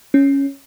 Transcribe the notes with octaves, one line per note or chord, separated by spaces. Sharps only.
C#4